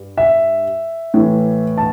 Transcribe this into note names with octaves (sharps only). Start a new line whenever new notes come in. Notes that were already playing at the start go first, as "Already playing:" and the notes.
Already playing: G2
E5
A2 E3
A5